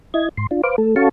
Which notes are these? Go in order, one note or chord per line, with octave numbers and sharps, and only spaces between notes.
E4 D#5 G#6
G#2 C6
D4 F4
B4 C5 F5 D6
A3 A4
C#4 F#4 A4 F5 A5 C#6